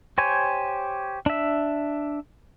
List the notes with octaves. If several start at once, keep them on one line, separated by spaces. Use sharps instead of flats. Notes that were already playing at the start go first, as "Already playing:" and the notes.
G4 C5 C#5 G#5
D4 E5